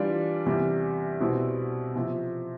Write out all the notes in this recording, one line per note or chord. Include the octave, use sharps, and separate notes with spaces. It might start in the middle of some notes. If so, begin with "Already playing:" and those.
Already playing: E3 G3 D4 F4
E2 C3 G3
C2 B2 G3 C4 E4
C3 F3 C4